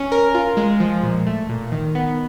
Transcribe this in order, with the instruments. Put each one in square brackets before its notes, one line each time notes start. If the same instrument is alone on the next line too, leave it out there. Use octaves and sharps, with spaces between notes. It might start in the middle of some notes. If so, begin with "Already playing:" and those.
Already playing: [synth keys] C#4
A#4
F4
G#3
F3
A#2
A3
A#2
D#3
B3